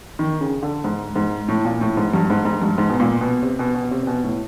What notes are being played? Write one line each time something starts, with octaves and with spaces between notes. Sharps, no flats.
D#3
C#3
D3
G#2
G#2
A2
A#2
A2
G#2
G2
G#2
G#2
G2
G#2
B2
A#2
B2
C3
B2
B2
C3
C3
B2
A2